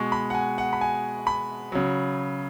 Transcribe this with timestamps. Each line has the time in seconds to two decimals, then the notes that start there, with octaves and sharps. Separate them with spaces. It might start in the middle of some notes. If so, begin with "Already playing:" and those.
Already playing: B2 G#3 C#6
0.12 B5
0.30 F#5
0.35 G#5
0.58 F#5
0.73 B5
0.81 G#5
1.27 B5
1.72 C#3 F#3